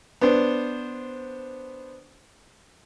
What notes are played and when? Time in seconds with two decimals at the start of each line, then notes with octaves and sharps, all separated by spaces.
0.21 B3 D4 C5